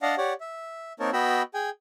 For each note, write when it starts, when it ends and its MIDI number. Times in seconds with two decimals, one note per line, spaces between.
0.02 0.15 62
0.02 0.15 74
0.02 0.15 75
0.02 0.15 77
0.02 0.15 78
0.02 0.15 81
0.18 0.33 67
0.18 0.33 73
0.18 0.33 74
0.18 0.33 78
0.40 0.93 76
1.00 1.10 58
1.00 1.10 60
1.00 1.10 63
1.00 1.10 70
1.00 1.10 73
1.00 1.10 81
1.13 1.42 59
1.13 1.42 66
1.13 1.42 75
1.13 1.42 79
1.13 1.42 83
1.13 1.42 88
1.54 1.70 68
1.54 1.70 79
1.54 1.70 80